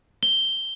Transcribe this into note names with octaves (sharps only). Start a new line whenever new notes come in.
G7